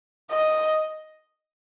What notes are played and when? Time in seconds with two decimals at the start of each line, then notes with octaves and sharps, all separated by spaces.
0.31 D#5